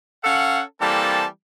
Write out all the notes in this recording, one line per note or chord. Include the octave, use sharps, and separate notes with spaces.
C#4 A4 F5 F#5
E3 G3 A#3 C4 A4 A5